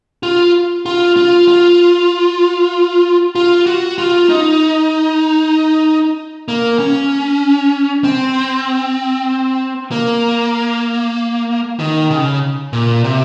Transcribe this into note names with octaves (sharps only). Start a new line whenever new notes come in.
F4
F4
F4
F4
F4
F#4
F4
D#4
A#3
C#4
C4
A#3
D#3
C#3
A#2
C3